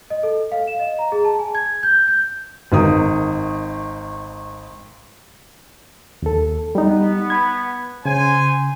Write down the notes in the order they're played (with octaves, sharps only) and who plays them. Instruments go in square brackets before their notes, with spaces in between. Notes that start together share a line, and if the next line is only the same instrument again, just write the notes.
[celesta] D#5
A4
F5
E7
D#5
A#5
G#4
A5
G#5
G#6
G6
G6
[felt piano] G#1 D#3 D#6
[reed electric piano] D#2 A4
[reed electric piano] G3 D#4 [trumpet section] B3
[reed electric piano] B5 G#6
[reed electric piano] C#3 [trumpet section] C5 G#5